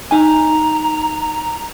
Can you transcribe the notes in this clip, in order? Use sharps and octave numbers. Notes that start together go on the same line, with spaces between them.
D#4 G#5 A#5